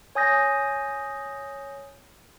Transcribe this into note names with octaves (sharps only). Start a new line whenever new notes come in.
C#5 G#5 D#6 G6 A#6